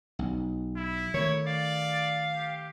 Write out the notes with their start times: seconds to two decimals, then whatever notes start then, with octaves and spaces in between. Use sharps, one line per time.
0.19 B1
0.76 E4
1.14 D#3 A3 C#5
1.47 D5 F5
2.35 G4